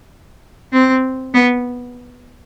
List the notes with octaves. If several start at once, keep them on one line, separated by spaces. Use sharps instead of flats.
C4
B3